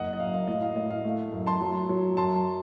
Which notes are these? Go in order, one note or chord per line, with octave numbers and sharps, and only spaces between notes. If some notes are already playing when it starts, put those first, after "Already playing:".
Already playing: F#1 A#3 D#5 F#5
D#5
F#2 F5
F5
A2 D#5
F5
A2 D#5
F5
A3
F#2
A5 C6
F#3
F#3
F#2 A5 C6